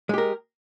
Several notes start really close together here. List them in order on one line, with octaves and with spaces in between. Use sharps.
G#3 G4 A#4